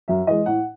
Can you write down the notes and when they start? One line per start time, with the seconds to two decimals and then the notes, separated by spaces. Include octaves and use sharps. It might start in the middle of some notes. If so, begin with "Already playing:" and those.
0.08 F#2 E5
0.27 E3 G#3 D#5
0.46 A2 F#5